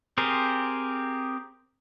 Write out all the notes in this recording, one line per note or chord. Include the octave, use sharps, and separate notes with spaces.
C4 G4 G#4 A#4 C5